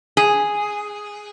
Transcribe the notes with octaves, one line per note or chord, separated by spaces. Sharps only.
G#4